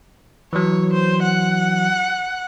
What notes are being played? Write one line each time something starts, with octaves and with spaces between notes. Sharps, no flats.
E3 F#3 C#5
C5
F#5